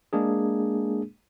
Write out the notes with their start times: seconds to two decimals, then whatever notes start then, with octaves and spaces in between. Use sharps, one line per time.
0.13 G#3 A#3 D4 G#4